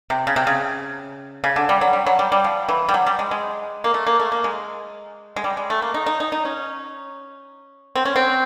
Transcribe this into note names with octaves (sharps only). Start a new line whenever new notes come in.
C3
C#3
C3
C#3
C#3
D3
G3
F#3
G3
F#3
G3
G3
F3
E3
G3
F#3
G3
G#3
G#3
A#3
A3
A#3
A3
A#3
G#3
G#3
G3
G#3
A3
A#3
D#4
D#4
D#4
D#4
C#4
C4
C#4
C4